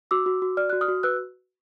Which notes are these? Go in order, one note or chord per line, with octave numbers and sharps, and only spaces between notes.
F#4 D6 E6
F#4
F#4
D5 F6
F#4 F#6
D#6 F6
F#4
B4 E6 F#6